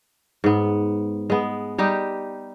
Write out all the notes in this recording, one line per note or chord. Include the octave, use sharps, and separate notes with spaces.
G#2 B3
G#3 B3
G3 D#4 G4